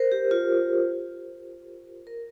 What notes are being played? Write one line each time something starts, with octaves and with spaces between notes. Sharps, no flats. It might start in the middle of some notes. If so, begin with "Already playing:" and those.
Already playing: A#4 C5
G4
F4
A#4